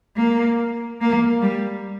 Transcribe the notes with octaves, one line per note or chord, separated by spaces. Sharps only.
A#3
A#3
G3